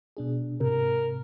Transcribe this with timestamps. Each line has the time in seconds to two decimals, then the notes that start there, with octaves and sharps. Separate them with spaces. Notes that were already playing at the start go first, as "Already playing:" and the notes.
0.17 B2 D4 G#4
0.61 G#2 C3 A#4